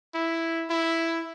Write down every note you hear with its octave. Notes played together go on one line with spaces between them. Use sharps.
E4
E4